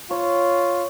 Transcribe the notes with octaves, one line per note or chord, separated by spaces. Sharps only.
F4 C#5